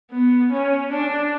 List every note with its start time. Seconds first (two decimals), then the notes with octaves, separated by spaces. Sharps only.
0.12 B3
0.52 C#4
0.92 D4